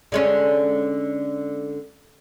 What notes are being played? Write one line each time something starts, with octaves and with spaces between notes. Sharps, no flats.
D3 G#3 C#4